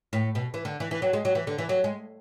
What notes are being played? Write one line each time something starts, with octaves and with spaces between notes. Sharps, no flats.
A2
B2
E3
D3
E3
E3
F#3
G#3
F#3
E3
D3
E3
F#3
G#3